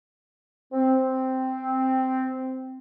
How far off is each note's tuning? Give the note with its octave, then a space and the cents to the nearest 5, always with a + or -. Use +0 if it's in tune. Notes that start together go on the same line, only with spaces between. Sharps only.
C4 -5